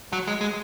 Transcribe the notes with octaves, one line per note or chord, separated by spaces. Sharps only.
F#3
G#3
G#3